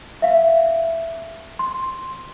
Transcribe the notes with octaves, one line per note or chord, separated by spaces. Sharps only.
E5 F5
C6